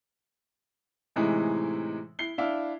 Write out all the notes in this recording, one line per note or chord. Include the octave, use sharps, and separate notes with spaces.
A2 C3 E3 G#3 D#4 E4
E4 C7 G7
D4 E4 E5 F5